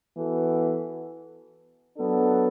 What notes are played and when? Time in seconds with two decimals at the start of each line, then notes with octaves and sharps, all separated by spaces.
0.15 E3 B3 F#4 A4
1.98 F#3 B3 D4 A4